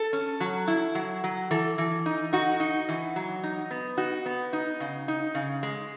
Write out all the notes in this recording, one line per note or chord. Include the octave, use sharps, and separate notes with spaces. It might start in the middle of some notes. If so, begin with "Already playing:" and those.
Already playing: A4
C#4
F#3
E4
F#3
F#3
E3 A4
E3
D#4
D#4 F#4
D#4
E3
F#3
D#4
B3
D#4 F#4
B3
D#4
C#3
D#4
C#3
G#3